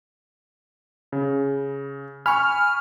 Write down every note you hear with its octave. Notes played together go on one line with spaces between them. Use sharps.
C#3
G#5 B5 C#6 F6